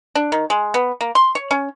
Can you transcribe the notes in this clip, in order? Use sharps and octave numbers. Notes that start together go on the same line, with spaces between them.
D4
D#3
G#3
B3
A#3
C6
C#5
C#4